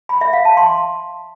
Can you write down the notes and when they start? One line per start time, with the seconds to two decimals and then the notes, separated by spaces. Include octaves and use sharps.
0.09 B5
0.21 E5
0.33 F5
0.45 A5
0.57 C6